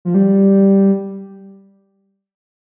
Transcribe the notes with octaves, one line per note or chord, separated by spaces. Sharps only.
F3
G3